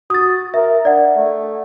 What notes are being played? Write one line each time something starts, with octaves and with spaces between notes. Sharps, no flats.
F#4 D#6 A6
A#4 E5
D4 D5 F#5
A3